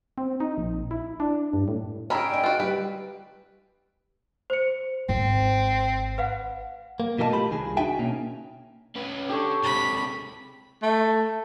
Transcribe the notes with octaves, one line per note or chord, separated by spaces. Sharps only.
C4
D#4
A#1
E4
D4
G2
A2
C#4 G#4 G5 A#5 B5 E6
D5 D#5
F4 F#4
G3 B4
C5 C#7
G#1 C4
B4 F5 F#5
A#3
B2 E3 A#3 A4 D#5 A5
A3 F4 G4 B5
C2 D#3 G#4
D4 D#4 F#4 E5 G5 G#5
B2 A#3 C#4
C#4 B4
D3 G4 A4 C#5
C3 G#3 B5
A3